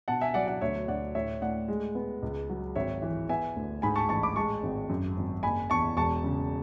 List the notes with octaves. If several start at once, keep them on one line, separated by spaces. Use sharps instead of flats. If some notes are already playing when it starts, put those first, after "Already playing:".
B2 F#5 A5
E5 G#5
F#3 D5 F#5
D5 F#5
D2 C#5 E5
D2 D5 F#5
A2 C#5 E5
A2 D5 F#5
G#3
B3
C#2
F#3
G#1 C#5 E5
E3
B3 E5 G#5
D2
G#2 G#5 B5
A5 C#6
A1 A5 C#6
B5 D6
G#3 A5 C#6
G#1
F#2
G#1
F#1 G#5 B5
E2 A5 C#6
E1 A5 C#6
C#3